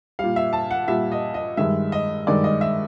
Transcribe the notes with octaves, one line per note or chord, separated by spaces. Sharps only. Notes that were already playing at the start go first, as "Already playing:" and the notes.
A#2 G3 F5
E5
A5
F#5
A#2 G3 E5
D#5
D#5
G2 D#3 G#3 E5
D#5
G2 D#3 G#3 D5
D#5
E5